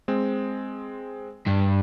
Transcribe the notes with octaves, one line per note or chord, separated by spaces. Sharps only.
G#3 C4
G2